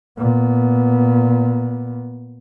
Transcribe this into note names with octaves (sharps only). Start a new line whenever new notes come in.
A#2 B3